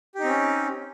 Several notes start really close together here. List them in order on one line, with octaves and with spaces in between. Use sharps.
G4 D#4 C4 C#4